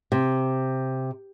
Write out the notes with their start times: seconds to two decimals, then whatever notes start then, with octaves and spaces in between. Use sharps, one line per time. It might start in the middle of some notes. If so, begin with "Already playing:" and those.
0.12 C3